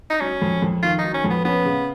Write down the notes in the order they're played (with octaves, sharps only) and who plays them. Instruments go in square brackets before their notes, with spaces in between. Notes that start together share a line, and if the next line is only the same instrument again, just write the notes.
[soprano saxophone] D#4
[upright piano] F#3 [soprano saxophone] C#4
[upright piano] F2
F2
[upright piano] D#3 [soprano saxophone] F4
[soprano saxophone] D#4
[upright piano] F#3
[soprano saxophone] C#4
[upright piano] F2
[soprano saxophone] B3
[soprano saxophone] B3 [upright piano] C#4
[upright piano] C#3